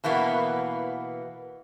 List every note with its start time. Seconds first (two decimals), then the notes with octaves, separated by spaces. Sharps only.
0.04 B2 E3 A#3 B3